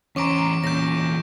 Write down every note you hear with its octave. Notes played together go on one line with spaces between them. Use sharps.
E2 C#4 C5 A#5 C#6 D6 D7
E2 A#2 C#4 G6 A#6